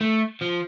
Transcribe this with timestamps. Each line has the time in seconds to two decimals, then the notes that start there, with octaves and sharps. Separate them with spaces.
0.01 A3
0.41 F3